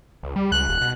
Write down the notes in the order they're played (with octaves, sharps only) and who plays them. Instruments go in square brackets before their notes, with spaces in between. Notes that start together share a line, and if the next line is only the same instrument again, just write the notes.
[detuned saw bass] C#2
G3
[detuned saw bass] C#2 [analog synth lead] F#6
[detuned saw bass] D#1
B2